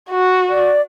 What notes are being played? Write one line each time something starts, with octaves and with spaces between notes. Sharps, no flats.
F#4
D5